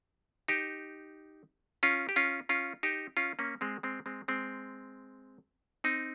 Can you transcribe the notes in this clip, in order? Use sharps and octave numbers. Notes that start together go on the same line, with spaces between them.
D#4 G4
C#4 F4
G4
C#4 F4
C#4 F4
D#4 G4
C#4 F4
A#3 C#4
G#3 C4
G#3 C4
G#3 C4
G#3 C4
C4 D#4